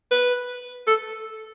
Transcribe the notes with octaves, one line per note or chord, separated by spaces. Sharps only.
B4
A4